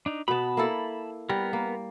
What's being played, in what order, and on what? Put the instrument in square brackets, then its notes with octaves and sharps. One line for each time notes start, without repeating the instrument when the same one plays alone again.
[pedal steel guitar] D4 D#4
[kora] B2 B3 [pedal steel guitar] A5 B5
[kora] A#3 E4 A4
[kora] G3 [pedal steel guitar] B3 A#4
[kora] A#3